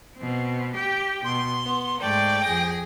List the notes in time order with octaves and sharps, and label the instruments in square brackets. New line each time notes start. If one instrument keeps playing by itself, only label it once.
[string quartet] B2 C4
G4 G5
[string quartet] B2 [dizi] C6
[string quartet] B3
[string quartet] G#2 A3 D5 [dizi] G5
[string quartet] F2 G#4 A#6